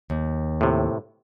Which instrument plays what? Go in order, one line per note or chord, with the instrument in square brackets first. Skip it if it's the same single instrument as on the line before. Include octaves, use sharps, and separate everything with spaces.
[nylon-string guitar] D#2
[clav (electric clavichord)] A2 C3